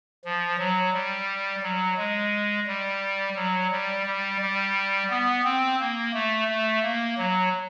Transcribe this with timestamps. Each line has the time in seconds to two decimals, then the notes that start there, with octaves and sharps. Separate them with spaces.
0.25 F3
0.59 F#3
0.93 G3
1.63 F#3
1.98 G#3
2.67 G3
3.36 F#3
3.72 G3
4.06 G3
4.41 G3
5.10 B3
5.44 C4
5.80 A#3
6.14 A3
6.48 A3
6.83 A#3
7.18 F#3